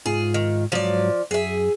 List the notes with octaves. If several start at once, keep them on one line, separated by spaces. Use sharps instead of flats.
G#2 F4 G#4
D#3
G#2 F3 F#3 C#5 D5
F#2 G#4 E5